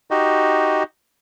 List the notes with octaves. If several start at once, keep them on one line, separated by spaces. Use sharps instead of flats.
D#4 F#4 G4 D#5